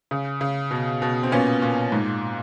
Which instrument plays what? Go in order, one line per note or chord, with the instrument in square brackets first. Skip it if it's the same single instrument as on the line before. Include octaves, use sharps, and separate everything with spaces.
[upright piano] C#3
C#3
B2
B2
C4
A#2 B3 C#4
A#2
G#2